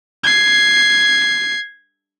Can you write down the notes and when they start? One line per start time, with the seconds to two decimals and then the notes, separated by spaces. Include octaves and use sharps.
0.24 G#6 C7